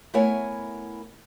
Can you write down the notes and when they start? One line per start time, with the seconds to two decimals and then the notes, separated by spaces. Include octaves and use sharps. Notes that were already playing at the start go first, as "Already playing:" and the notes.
0.14 A3 B3 E4 A#4 C#5 G#5